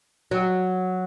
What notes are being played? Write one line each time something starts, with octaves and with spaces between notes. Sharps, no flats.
F#3